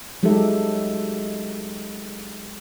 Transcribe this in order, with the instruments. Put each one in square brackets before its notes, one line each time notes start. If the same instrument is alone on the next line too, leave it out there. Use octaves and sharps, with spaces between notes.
[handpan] F#3 G#3 D#4 G4 A4 E5